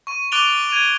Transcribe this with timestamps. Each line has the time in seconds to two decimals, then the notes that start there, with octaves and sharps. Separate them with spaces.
0.07 C#6 D#7
0.32 D6 F#6 A6 D7 F7 G7
0.70 G#6 D#7 F7